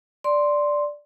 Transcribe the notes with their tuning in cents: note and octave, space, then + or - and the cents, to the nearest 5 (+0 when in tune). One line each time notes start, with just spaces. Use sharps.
D5 +0 C6 +0